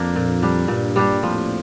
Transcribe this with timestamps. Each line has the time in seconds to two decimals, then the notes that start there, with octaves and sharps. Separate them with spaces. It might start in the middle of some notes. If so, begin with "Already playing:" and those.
Already playing: F2 A#3 D4
0.16 A#2
0.42 G3 D4 G4
0.68 G2 A#2
0.96 G3 D4 G4
1.22 F2 A2 F3